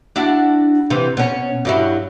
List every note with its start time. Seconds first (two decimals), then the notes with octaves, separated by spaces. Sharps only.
0.16 D4 E4 F#4
0.90 C3 E3
1.17 B2 C#4
1.65 G2 F#3 E4